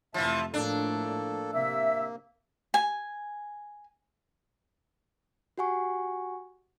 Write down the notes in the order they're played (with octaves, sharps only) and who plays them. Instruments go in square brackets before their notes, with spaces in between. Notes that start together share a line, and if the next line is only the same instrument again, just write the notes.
[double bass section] F1 [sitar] E3 F3 [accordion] E5 A5
[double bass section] A2 F3 A3 [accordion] A#3 A4 [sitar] D4
[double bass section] C3 [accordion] A#3 [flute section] E5 E6
[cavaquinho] G#5
[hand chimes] F#4 G4 F#5 G#5 C#6